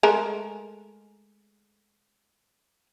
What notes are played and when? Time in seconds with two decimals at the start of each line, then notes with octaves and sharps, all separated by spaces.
0.03 G#3 A3 A#4